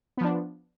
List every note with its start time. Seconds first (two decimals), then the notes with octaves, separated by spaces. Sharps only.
0.17 B3
0.21 F3
0.24 D4